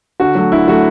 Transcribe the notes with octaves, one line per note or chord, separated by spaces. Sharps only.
D3 F#4
F#3 A3
D3 E4
F#3 A3 F#4